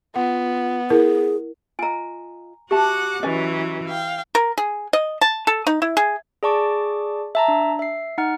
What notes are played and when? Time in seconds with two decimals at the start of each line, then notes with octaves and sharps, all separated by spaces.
0.16 B3 F4 F#5
0.90 E4 G#4 A#4
1.79 F4 D#5 G#5 A#5
2.71 F#4 G4 E5 F#5 A5 D6
3.23 E3 F#3 C#4 B4 D#5 G#5
3.87 F5 G5
4.35 A#4
4.58 G#4
4.93 D#5
5.21 A5
5.47 A4
5.67 D#4
5.82 E4
5.97 G#4
6.43 G#4 D5 A5 C#6 D6
7.35 E5 A5 A#5
7.48 D4
7.79 E5 C7
8.18 D#4 F#5 F6